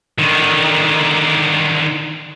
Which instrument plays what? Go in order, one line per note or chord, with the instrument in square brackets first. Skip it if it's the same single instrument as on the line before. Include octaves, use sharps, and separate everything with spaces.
[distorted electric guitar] D3 D#3